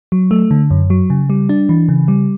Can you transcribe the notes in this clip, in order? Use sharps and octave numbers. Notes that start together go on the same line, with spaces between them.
F#3
A3
D3
F#2
F#3
C#3
G3
D4
E3
C#3
G3